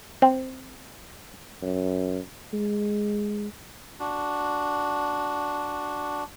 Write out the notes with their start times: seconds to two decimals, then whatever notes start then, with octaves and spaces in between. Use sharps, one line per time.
0.22 C4
1.62 F#2
2.53 G#3
4.00 D4 F#4